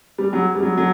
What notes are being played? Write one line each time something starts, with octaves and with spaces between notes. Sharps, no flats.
G3 G#4
F#3 G4
G#4
G3
F#3
F#3 A4